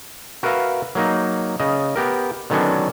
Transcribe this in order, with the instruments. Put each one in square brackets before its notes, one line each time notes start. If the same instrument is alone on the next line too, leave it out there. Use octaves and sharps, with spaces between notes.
[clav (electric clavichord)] F#4 A#4 B4 E5 F5
F#3 A#3 D#4
C#3 D#5
B3 G4 A#4
D3 D#3 F#3 B3 C#4 D4